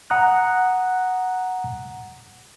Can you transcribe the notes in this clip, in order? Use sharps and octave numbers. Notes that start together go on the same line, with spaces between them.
F#5 A#5 D#6 F#6